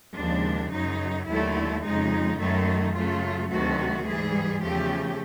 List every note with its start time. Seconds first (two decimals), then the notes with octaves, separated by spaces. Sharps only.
0.16 D#2 C#3 F3 G#3 D4
0.72 F#2 C#3 F#3 D#4
1.28 D#2 D3 F#3 A3 E4
1.84 F2 C#3 F3 G#3 D#4
2.39 F#2 D#3 F#3 A3 D#4
2.95 F#2 C#3 F#3 A3 F4
3.51 D2 C3 D#3 F#3 A3 F#4
4.06 G#2 E3 G3 G#4
4.61 E2 C#3 F3 A3 G4